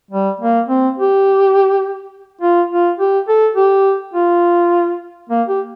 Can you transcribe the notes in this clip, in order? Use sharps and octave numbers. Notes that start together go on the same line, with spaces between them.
G3
A#3
C4
G4
F4
F4
G4
A4
G4
F4
A#3
G4